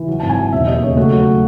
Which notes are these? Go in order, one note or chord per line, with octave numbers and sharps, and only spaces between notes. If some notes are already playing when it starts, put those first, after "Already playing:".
Already playing: E3
F#3
G#1 A5
G#5
F#3
E1 E5
D#2 D#5
C#3 C#5
A3 F#4
F#3
F#4